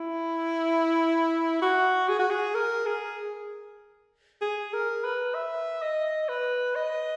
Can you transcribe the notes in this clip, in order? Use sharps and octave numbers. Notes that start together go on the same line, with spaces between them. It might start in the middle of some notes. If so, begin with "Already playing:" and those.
Already playing: E4
F#4
G#4
F#4
G#4
A#4
G#4
G#4
A#4
B4
E5
D#5
B4
D#5